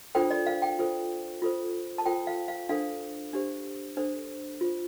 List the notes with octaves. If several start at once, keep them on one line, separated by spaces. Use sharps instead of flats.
D4 F4 A4 C5 G5
D5
F5
G5
F4 A4 C5
F4 A4 C5
A5
F4 A4 C5 G5
F5
F5
D4 A4 C5 F5
D4 G4 C5
D4 A4 C5
F4 C5